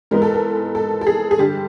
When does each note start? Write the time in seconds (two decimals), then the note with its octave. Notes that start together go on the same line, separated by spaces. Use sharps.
0.11 G#2 E3 G#3 B3 A#4
0.22 A4
0.34 A#4
0.75 A4
1.01 A4
1.07 G#4
1.31 G#4
1.39 G2 D3 G3 G4